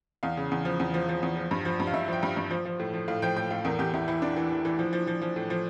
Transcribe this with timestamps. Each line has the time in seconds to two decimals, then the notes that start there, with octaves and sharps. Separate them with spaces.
0.23 E2 F5
0.37 C#3
0.52 E2
0.65 F3
0.80 E2
0.94 F3
1.09 F3
1.23 E2
1.37 F3
1.51 G2
1.65 F3
1.80 G2
1.87 F5
1.93 G2 E5
2.08 F3 G5
2.23 G2
2.37 G2
2.51 F3
2.65 F3
2.80 A2
2.94 F3
3.08 A2 F5
3.22 F3 G5
3.36 A2 G5
3.51 A2 F5
3.65 E2 A#4
3.79 E2 G4
3.93 E2 E4
4.08 E3 E4
4.22 E3 D4
4.36 E3
4.51 E3
4.65 E3
4.79 F3
4.93 F3
5.07 F3
5.22 F3
5.36 A2
5.50 F3